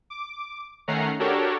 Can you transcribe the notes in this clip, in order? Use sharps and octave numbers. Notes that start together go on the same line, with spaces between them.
D6
D#3 A3 C#4 F#5 A#5 C7
D4 F#4 G4 A4 A#4 C#5